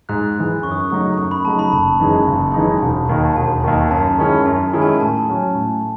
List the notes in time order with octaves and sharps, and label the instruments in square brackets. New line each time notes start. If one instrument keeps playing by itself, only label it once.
[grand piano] G#2 [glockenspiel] F#6
[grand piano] E3 G#3
[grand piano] F#2 [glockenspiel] C#6
[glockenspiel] D#6
C#6
[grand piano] C#3 F#3 A3 D#4 [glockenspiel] C#6
[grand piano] F#2 [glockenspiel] C#6
[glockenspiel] B5
[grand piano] C#3 F#3 A3 D#4 [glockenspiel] A5
[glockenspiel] B5
[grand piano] F#1 [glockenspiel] A5
[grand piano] F#2 E3 G#3 D#4
F#1
F#2 E3 G#3 D#4
E1
D#2 D#3
[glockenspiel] A5
[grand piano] E1 [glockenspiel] G#5
[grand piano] D#2 D#3
[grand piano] F#2 [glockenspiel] A5
[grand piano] D#3 G#3 C#4 E4
[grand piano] F#2 [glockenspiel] G#5
[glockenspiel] A5
[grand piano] D#3 G#3 C#4 E4
[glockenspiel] G#5
[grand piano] A2 [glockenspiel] A5
[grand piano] F#3 C#4 F#4
A2